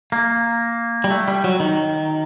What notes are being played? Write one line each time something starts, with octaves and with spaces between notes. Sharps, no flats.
A#3
G3
A3
G3
F#3
D#3